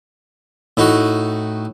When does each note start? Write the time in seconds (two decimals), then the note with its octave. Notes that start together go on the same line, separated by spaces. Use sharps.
0.77 A2 D#4 F#4